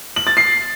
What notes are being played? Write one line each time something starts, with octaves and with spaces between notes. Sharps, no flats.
F#7
A6
C7